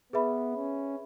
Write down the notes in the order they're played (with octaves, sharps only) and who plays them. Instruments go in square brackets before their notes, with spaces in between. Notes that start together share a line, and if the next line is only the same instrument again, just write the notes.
[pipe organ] B3 [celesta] G#4 B4 E5 B5
[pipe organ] C#4